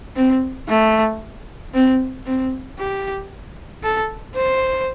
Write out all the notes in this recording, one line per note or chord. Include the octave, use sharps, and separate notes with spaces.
C4
A3
C4
C4
G4
A4
C5